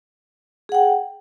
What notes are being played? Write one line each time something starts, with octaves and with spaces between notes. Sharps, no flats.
G#4 F#5 G5